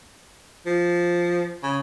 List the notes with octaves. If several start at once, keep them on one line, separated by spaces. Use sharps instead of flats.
F3
C#3